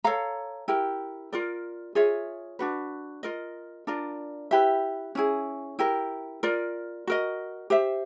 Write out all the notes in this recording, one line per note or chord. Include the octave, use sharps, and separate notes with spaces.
A4 C#5 F5 A#5
E4 G4 A#4
F4 A#4 D5
F4 G#4 C#5 E5
D4 F#4 B4
F4 A#4 D#5
D4 F4 A#4 D5
E4 G4 B4 E5
C#4 E4 G#4
E4 G4 A#4
F4 A#4 D5
F#4 A#4 D#5
G4 C5 E5